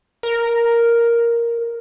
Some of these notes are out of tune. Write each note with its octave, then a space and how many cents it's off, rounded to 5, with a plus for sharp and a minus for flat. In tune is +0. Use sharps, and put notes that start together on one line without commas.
A#4 +5